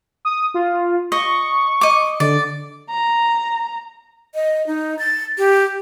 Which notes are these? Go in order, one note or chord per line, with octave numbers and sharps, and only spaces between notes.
D#6
F4
D#5 C#6
D#5 D6
D3 D5
A#5
D#5
D#4
A6
G4